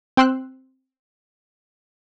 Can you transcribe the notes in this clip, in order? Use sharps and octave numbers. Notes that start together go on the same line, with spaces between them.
C4 G5 C6 E6 F#6